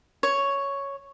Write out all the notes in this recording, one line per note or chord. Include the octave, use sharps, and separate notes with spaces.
C#5